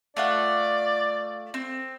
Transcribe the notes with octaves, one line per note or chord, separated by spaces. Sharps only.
A3 F4 D5 F#5
C4